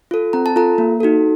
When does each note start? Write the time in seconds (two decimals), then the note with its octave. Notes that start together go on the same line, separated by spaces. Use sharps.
0.11 F4 A4
0.33 C4 A#5
0.46 A5
0.56 F4 A4 A#5
0.78 A#3
1.00 D#4 F#4 A4